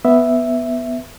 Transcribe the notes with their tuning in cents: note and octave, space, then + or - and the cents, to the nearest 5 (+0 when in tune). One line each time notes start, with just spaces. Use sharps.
B3 +0 E5 +0